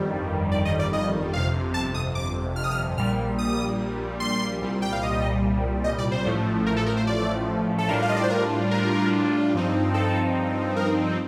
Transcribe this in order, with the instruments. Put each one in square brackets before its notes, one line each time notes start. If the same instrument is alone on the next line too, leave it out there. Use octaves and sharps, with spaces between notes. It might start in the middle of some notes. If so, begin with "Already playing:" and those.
Already playing: [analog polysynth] G1 F2 D#3 G3
D5
D#5
D5
D#5
G1 F2 C3 F5
A5
D#6
D6
F6
D#6
F6
A#1 A#2 G3 F6
D#6
C6
C2 A#2 G3
G5
F5
D#5
D#5
D5
C5
A1 A2 F3 A3
A#4
A4
A#4
C5
D5
A4
A2 G3 D4 F4 A#4
F5
D#5
D5
C5
A#4
A#4
G2 F3 C4 D#4
A4
A#4